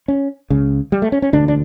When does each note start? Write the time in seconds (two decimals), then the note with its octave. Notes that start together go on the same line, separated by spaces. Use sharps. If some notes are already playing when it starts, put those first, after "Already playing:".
0.08 C#4
0.50 C#2 C#3
0.92 G3
1.02 A3
1.12 C#4
1.22 C#4
1.33 E1 D2 D3 D4
1.48 D4